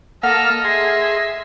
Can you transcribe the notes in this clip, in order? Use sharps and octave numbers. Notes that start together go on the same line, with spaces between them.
A#3 A4 D#5 F5 F#5 A5 F6
G#4 E5 C6